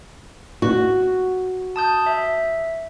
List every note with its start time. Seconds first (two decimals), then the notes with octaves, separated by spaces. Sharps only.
0.62 F#4
1.76 A5 D#6 G6
2.06 E5